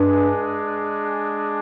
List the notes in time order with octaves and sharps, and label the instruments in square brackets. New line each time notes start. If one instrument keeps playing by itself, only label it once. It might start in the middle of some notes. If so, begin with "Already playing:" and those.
Already playing: [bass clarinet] G2 [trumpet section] G#3 D4 G#4